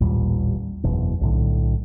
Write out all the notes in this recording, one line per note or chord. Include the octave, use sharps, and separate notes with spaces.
A1 D#2 A#2 G3
F#1 E2 B2
B1 A2 D3